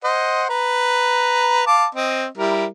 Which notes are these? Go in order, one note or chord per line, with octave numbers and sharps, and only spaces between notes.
C5 D#5 F#5
B4 A#5
F5 A5 D6
C4 D#5
G3 E4 A#4